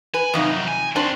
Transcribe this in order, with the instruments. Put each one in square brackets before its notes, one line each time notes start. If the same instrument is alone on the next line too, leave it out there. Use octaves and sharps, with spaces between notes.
[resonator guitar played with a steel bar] B4 [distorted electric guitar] G#5
[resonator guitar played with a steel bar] F2 C3 D#4 [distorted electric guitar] D#3 F#3
[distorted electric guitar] G#5
[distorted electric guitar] C4 F#4 [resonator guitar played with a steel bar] D4 C5